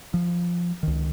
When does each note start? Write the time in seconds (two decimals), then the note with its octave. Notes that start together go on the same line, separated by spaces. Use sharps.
0.14 F3
0.83 C#2 D#3